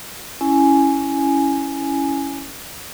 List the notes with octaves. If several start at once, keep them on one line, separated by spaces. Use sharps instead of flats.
C#4 E4 G#5